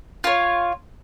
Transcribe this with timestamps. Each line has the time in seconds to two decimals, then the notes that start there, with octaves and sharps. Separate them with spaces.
0.24 F4 C#5